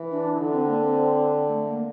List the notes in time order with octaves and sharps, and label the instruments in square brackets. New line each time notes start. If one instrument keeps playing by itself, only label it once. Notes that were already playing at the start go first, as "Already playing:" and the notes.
Already playing: [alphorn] E3
[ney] D4
E4
[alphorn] D3 [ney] D4
[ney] C4
A#3
C4
A3
A#3